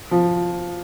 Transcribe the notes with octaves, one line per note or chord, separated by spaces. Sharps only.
F3